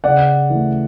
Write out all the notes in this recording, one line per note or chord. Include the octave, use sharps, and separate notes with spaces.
C#3 D5 F#5
E3 A3